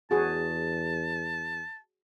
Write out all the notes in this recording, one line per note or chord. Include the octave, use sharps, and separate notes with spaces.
E2 F#4 G#4 A5